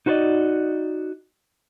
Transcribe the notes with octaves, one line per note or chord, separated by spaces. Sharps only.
D#4 F#4 B4 C5 D5 D#5